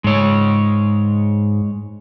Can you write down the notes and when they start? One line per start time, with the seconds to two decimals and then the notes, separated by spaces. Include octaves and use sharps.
0.04 G#2 G#3 C#5